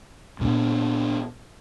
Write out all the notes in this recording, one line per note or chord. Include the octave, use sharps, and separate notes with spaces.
G2 A#2 B3 D4